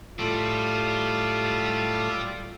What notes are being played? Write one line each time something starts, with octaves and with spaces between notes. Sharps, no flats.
A2 G3 F4 E6